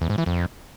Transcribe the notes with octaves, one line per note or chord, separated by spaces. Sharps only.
E2
G#2
E3
F2